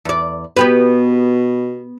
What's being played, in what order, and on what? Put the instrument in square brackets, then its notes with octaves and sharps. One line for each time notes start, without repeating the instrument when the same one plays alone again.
[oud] E2 D5
[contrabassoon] B2 [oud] B3 G4 B4